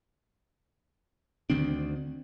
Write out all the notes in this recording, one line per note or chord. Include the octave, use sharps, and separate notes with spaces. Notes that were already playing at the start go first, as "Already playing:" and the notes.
D2 D#3 C4 D4